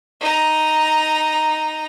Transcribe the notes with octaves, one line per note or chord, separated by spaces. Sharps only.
D#4 A#5